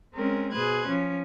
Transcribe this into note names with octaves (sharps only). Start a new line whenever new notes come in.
G#3 C4 C#4 A#4
B2 G#4 B4 C5 F#6 G#6
F3 C#4